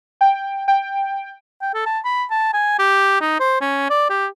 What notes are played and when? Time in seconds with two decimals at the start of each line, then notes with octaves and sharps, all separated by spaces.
0.21 G5
0.68 G5
1.62 G5
1.74 A4
1.86 A5
2.05 B5
2.30 A5
2.53 G#5
2.79 G4
3.21 D#4
3.40 C5
3.61 C#4
3.90 D5
4.10 G4